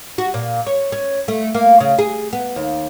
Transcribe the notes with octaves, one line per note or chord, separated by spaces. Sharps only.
F#4
A#2
C#5
C#4
A3
A#3
C#3
G#4
B3
D#2